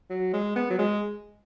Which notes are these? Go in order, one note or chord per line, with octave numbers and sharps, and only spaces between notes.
F#3
G#3
B3
F#3
G#3